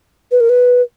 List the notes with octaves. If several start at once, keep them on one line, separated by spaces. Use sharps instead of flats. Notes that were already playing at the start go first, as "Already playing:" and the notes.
B4
A#4
B4